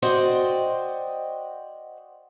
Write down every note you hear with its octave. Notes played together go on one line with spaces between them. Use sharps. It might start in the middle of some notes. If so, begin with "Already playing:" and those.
F#4 C5 D5 D#5 G5